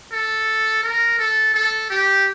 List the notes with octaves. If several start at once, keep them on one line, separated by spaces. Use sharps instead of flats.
A4
A#4
A4
A4
G4